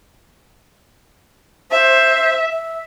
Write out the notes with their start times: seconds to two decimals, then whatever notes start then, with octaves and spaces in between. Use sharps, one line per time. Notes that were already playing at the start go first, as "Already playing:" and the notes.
1.71 C5 E5
2.52 E5